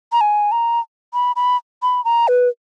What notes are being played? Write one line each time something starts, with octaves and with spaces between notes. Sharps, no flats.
A#5
G#5
A#5
B5
B5
B5
A#5
B4